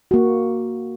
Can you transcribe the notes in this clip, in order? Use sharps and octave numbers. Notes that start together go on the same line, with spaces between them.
A#3 F#4